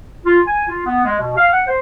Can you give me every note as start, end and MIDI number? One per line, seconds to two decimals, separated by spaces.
0.25 0.39 65
0.46 0.67 80
0.68 0.84 65
0.86 1.02 59
1.05 1.18 56
1.19 1.32 47
1.37 1.47 77
1.53 1.63 78
1.67 1.79 72